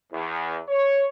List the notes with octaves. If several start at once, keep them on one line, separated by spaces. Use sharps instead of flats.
E2
C#5